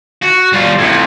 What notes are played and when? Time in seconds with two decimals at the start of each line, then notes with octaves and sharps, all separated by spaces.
0.22 F#4
0.53 G3 F4
0.79 F2 A2